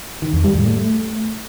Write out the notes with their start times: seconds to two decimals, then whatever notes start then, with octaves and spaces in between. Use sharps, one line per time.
0.22 D#3
0.33 F2
0.44 G3
0.55 A2
0.66 A3